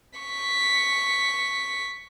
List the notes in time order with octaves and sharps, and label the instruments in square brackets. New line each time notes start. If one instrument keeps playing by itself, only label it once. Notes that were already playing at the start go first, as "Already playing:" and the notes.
[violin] C#6 B6